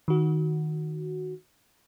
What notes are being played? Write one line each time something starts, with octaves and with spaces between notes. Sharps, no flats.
D#3 F#4